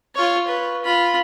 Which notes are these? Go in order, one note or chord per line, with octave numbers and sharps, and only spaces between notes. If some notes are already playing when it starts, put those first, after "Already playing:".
F4 C#5
B4
F4 B5